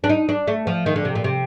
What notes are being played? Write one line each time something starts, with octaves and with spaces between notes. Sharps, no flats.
D4
D#4
D4
A3
F3
D#3
D3
C3
A#2
C3